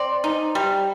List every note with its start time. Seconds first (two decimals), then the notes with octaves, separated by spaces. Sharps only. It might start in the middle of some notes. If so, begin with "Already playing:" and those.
Already playing: C4 D5
0.24 D#4
0.55 G3